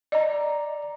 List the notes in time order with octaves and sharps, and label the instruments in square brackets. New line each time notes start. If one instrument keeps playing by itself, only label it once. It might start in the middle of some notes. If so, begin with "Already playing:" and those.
[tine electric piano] D5 A#5 [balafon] D#5